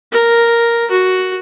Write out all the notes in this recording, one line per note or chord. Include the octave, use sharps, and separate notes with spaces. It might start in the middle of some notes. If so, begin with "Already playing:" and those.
A#4
F#4